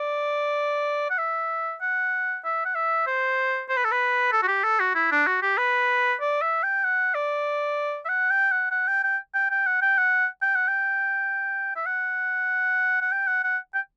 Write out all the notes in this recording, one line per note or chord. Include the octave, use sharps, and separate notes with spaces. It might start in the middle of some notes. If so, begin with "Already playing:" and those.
Already playing: D5
F#5
E5
F#5
E5
F#5
E5
C5
C5
B4
A4
B4
A4
F#4
G4
A4
F#4
E4
D4
F#4
G4
B4
D5
E5
G5
F#5
D5
E5
F#5
G5
F#5
F#5
G5
G5
G5
G5
F#5
G5
F#5
G5
F#5
G5
E5
F#5
F#5
G5
F#5
F#5
G5